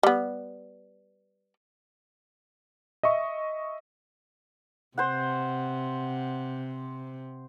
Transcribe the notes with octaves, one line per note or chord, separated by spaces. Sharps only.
G3 B3
D#5 E5 C#6
C3 C5 F#5